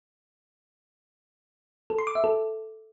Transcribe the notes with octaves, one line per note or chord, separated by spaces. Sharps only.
A4
C6
D6
E5
A4